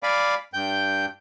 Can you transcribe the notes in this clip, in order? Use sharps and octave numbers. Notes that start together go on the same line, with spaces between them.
D5 F5 G#5 B5 D6
G2 G5 G6